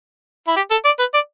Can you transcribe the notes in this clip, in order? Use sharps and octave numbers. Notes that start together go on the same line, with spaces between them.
E4
G4
A4
D5
B4
D5